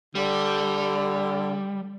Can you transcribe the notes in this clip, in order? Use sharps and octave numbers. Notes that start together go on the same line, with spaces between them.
D3 G3